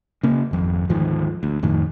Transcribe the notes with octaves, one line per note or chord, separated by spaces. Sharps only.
C#3 A#3
G#1 F2
D2 G#2 D#3 F3
D2
F2 A2 D#3